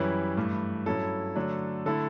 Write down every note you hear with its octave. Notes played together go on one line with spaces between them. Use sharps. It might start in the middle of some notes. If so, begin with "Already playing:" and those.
Already playing: F#2 E3 G3 C#4 E4 B4
G2 E3 A3
G2 F#3 C#4 E4 A4
D3 F#3 A3 D4
D3 A3 E4 A4